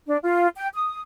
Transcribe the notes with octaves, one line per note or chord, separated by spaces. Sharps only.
D4
F4
G5
D#6